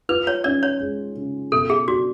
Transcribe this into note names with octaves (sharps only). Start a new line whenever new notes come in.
F4 B4
C#5
C#4 D5
C#5
G#3
C#3
B2 A4
G#4
D4 F#4